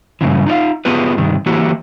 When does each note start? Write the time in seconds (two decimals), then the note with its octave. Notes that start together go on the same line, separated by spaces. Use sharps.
0.21 G2 A#2 C#3 E3
0.47 D#4 F4 C#5 F5
0.85 B3 F4 G4 G#4 B4
1.17 G2 C3 D#3
1.46 E3 A#3 E4 F#4 G4